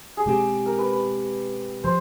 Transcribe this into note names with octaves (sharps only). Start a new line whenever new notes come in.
G#4
B2 G#3 C4 G4
A#4
B4
B4
F3 C5